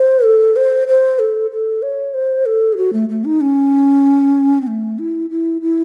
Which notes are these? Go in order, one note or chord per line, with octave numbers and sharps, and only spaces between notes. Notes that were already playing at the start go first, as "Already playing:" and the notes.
Already playing: C5
A4
C5
C5
A4
A4
C#5
C5
A4
G#4
F#4
A3
A3
D#4
C#4
C4
A3
E4
E4
E4